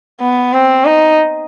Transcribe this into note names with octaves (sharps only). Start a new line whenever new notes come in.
B3
C4
D#4